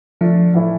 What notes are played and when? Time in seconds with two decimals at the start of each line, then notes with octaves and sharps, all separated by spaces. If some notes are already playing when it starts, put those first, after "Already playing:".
0.21 D3 F3 A3 D4
0.54 A2 E3 A3 E4